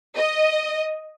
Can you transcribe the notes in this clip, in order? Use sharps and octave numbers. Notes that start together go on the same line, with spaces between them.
D#5